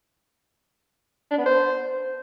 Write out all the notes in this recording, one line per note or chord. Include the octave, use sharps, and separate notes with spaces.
D4
B3
C5